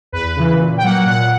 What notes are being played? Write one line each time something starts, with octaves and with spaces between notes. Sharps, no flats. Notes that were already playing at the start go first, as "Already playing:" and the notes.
E2 B4
C#3 E3
A#2
G5
F#3 A#3 F#5
A#2 F#5